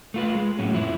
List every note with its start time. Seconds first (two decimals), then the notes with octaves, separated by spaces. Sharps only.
0.14 A3 F4 B4
0.35 G#3
0.59 A2 F#3 C#4
0.73 F2 F3 E4